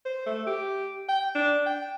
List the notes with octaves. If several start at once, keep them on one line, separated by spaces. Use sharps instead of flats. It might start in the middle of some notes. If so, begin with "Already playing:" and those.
C5
A3
G4
G5
D4
G5